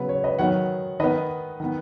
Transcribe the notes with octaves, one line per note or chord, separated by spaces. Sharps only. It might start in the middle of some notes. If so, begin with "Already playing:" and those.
Already playing: C#3 F#3 B3 B4
C#5
B4 D#5
D#3 F#3 B3 C#5 F#5
D#3 B3 B4 D#5
D#3 B3